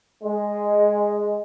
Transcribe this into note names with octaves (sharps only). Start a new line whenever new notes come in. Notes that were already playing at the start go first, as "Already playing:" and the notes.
G#3